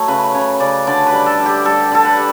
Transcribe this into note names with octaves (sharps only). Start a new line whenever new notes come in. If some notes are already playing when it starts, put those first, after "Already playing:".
Already playing: F#3 A3 C#5
C#3 B4
C#3 C#5
C#3 D5
D3 D5
B4
G3
A4
G3
G4
G3 A4
D3 A4
B4
G3